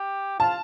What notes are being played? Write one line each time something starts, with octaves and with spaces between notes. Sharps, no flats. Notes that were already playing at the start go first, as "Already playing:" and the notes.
Already playing: G4
F4 A5